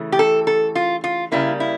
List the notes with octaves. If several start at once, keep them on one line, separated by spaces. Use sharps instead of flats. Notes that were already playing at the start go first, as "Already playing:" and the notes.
Already playing: C#3 E3 A3
G4
A4
A4
F4
F4
C#3 G3 A#3 E4
E4